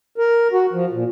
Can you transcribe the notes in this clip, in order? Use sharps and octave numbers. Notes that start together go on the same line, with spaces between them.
A#4
F#4
F3
A#2